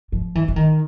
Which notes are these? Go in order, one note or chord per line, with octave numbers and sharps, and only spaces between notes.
F3
E3
E3
D#3